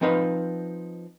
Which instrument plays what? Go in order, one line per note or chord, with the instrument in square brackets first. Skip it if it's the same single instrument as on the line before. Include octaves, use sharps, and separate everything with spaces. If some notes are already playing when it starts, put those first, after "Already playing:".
[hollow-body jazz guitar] F3 C4 D#4 B4 F5